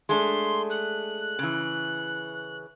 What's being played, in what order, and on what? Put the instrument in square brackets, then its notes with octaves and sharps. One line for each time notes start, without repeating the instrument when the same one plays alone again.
[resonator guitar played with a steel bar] G#3 A3 D4 [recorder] C6
[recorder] F#6
[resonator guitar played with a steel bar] C#3 E3